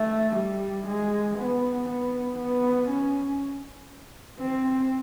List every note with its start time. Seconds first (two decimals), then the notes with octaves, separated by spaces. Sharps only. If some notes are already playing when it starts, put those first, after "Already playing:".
Already playing: A3
0.37 G3
0.87 G#3
1.38 B3
1.89 B3
2.39 B3
2.89 C#4
4.40 C4